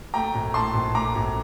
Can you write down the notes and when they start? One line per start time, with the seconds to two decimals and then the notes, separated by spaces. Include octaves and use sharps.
0.14 A3 G5 A#5
0.35 A#1
0.54 A2 A5 C6
0.74 A#1
0.95 A3 A#5 D6
1.15 A#1